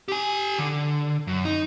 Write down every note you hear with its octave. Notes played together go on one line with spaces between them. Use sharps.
G4 G#5
D3
F#2
D#4